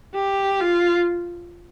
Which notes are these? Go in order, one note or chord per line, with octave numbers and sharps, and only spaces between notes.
G4
F4